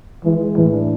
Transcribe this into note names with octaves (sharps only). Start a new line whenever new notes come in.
E3 G#3
G#4
A2 E3
D4